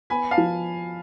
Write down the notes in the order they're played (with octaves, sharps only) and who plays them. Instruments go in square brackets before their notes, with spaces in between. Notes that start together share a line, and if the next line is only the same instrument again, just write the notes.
[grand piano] B3 [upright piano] G#5 B5
[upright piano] F5 A5
[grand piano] F3